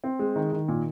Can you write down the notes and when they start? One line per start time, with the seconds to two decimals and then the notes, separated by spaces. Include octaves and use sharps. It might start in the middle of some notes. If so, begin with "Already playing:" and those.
0.04 C4
0.19 G#3
0.36 D#3
0.52 D#3
0.68 A#2